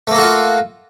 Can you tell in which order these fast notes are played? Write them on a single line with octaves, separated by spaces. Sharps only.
A3 A#3 A4 F#4 F4